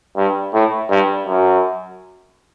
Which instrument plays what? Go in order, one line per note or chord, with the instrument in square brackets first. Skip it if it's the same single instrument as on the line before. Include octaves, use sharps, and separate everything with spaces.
[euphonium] G2
A2
G2
F#2